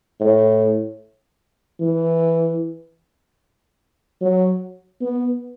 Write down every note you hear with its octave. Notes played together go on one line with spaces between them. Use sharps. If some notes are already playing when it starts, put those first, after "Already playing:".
A2
E3
F#3
B3